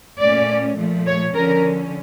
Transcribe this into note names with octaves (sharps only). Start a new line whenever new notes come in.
A#2 A3 C#4 D5
A#2 F3 A3
C#5
D3 F3 C#4 A#4